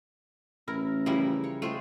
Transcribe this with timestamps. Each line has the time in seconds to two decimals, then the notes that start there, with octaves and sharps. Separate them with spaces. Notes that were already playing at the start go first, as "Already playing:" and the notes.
0.68 A1 E4 A#4
1.06 C#3 F3 G3 E4 A#4
1.44 C#5
1.62 G#3 A3 F4 C5 G5